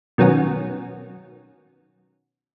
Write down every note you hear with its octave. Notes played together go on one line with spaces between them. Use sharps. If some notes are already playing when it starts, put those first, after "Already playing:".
B2 D#3 F#3 B3 C#4 F#4